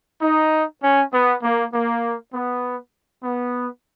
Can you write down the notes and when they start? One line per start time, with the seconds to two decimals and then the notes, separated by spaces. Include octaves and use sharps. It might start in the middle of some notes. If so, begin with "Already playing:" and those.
0.21 D#4
0.82 C#4
1.12 B3
1.42 A#3
1.72 A#3
2.33 B3
3.23 B3